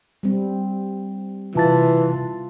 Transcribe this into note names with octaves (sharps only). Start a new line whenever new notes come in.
G3 C4
C3 E3 F4 A5 A6